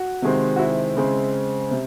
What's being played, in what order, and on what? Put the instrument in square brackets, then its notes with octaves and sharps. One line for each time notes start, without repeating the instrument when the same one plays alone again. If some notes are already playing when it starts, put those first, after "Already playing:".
Already playing: [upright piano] F#4
C3 D#3 G#3 C4
F#4
E4
C#3 G#3 C4
C3